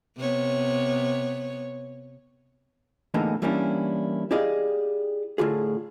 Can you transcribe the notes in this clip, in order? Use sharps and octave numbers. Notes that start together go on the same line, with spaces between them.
C3 B3 C#5
E2 A2 D3 E3 A#3 D#4
E3 G3 A#3 C#4 D4 E4
E4 G4 G#4 D5 D#5 F5
A2 D3 F4 G#4